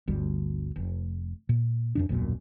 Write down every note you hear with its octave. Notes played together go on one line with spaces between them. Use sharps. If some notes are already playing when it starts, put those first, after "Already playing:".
G1 D2 G3
F1
A#2
F2 A#2 D4
D#1 B1 F#2 A#2